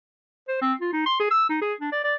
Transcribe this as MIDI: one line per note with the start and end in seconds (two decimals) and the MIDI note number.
0.48 0.60 72
0.62 0.74 60
0.81 0.92 65
0.93 1.03 63
1.06 1.16 84
1.20 1.28 68
1.31 1.47 88
1.50 1.61 63
1.61 1.74 68
1.81 1.91 62
1.93 2.01 74
2.04 2.15 74